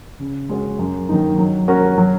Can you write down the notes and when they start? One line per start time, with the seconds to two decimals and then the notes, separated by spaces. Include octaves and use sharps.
0.20 C#3
0.49 G#3 C#4 F#4
0.79 F#2
1.09 D#3 F#3 A#3 D#4
1.38 F#3
1.68 C#4 F#4 A#4
1.98 F#3